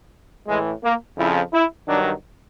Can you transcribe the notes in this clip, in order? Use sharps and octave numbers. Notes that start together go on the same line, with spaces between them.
A2 E3 G#3
A#3
F2 C#3 F3 E4
E4
G2 D#3 F#3 D4